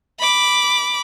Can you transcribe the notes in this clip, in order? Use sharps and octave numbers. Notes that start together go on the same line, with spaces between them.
B5 D6